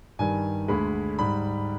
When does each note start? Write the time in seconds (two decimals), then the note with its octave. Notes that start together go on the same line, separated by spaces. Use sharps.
0.19 G2 D#3 G3 G#5
0.68 D2 D3 G#3 B5
1.19 G#2 G3 B5